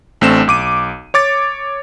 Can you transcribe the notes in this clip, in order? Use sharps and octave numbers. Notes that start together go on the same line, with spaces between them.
A1 A3 C4 D4 E7
B1 D6 D#7
C#5 D6 A6